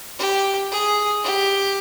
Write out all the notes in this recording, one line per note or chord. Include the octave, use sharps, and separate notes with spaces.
G4
G#4
G4